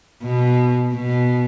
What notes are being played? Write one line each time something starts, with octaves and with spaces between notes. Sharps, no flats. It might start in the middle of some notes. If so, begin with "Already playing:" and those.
B2
B2